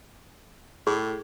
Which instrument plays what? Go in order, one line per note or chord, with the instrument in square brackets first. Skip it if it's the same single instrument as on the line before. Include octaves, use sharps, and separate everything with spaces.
[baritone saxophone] A2 [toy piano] G#4